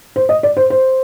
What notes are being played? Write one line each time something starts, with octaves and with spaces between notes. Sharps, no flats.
C5
D#5
D5
C5
C5